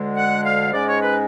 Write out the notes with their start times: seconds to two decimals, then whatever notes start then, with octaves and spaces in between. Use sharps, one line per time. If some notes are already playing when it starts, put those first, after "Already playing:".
Already playing: D2 D3 G#3
0.13 F#5
0.43 F5
0.72 G#2 G#3 C#4 D5
0.87 C#5
1.02 B4